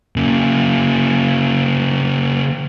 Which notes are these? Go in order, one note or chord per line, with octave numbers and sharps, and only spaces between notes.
C#3 A#3